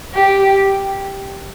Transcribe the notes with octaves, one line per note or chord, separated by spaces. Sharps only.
G4